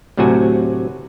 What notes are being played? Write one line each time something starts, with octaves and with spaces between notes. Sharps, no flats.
D2 A2 C3 F#3 F#4 G#5